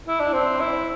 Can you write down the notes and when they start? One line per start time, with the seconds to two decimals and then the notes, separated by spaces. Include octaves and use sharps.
0.08 E4
0.20 D4
0.33 C4
0.60 E4